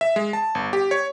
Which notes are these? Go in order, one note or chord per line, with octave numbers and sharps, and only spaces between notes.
E5
G#3
A5
G1
G4
C#5